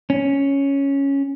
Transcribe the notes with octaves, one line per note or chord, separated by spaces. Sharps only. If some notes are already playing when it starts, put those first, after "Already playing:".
C#4